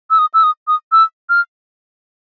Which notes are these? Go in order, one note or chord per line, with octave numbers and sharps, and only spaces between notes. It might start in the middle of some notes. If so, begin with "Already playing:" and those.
E6
D#6
E6
D#6
D#6
E6
F6